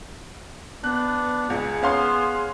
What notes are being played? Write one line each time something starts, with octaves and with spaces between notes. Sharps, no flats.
B3 D4 F#6
C#2 G#4
B3 C#4 F5 C6